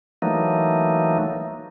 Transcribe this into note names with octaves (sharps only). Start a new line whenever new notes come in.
E3 F#3 A3 A#3 D#4